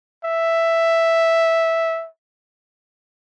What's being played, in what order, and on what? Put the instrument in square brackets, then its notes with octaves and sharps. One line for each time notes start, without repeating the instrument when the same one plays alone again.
[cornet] E5